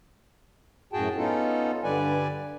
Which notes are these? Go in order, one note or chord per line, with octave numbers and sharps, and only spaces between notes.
F#2 A2 F#4 G#4 G5 A5
B3 C#4 D#4 F4 A4
G2 D3 G3 B4 D5 G#5